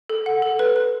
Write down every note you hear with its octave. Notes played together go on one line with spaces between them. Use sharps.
A4
F#5
A4
B4
B4